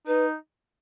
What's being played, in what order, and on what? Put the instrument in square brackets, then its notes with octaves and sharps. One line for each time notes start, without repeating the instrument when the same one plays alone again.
[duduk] D#4 [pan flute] B4